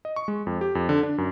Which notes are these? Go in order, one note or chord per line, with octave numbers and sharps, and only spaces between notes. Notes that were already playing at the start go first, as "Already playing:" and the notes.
D#5
C#6
G#3
F2
G4
F2
D3
D4
F#2